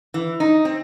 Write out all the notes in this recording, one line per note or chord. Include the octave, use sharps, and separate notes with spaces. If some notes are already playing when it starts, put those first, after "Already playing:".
E3
D#4
C4